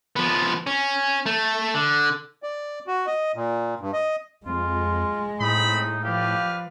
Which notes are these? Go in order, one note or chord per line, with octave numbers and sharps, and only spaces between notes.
F3 B3
C#4
A3
D3
D5
F#4
D#5
A#2
G2
D#5
F2 G#3 F4
A2 C4 D#4 D#5 B5
F3 G4 B4 D5 F5